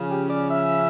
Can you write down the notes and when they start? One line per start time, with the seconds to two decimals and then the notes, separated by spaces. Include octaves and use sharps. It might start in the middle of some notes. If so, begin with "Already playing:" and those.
Already playing: C#3 F3 C#4
0.10 G4
0.30 D5
0.51 E5